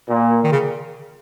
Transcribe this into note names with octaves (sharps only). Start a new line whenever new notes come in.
A#2
D#3
C#3